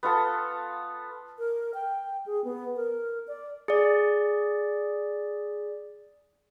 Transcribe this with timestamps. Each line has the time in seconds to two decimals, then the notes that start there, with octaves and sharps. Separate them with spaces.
0.03 B3 F4 A4
1.39 A#4
1.74 G5
2.26 G#4
2.44 B3
2.76 A#4
3.28 D5
3.68 G#4 D5